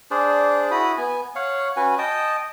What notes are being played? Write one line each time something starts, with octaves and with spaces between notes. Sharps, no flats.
D4 G#4 C5 D5
E4 F#4 B5 D#6
B3 G#5
C#5 F5 F#5
C#4 F#4 B4 G#5
D#5 G5 A5 D#6